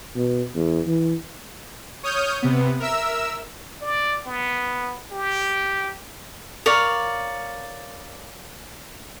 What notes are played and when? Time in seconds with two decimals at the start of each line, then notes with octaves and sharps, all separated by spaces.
0.16 B2
0.55 E2
0.86 E3
2.03 C#5 D#6 F6 G6
2.42 C3 B3
2.80 A#4 E5 E6
3.82 D5
4.26 B3
5.11 G4
6.66 A#4 C#5 D5 F5